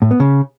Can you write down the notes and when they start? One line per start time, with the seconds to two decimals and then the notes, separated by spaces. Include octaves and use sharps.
0.02 A2
0.11 B3
0.20 C#3